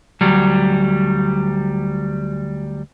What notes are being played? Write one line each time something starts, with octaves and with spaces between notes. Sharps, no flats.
D2 F#3 G3